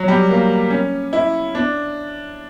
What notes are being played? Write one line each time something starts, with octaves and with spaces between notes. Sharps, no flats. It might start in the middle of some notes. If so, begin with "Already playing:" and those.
Already playing: F#3
G3
A#3
C#4
E4
D4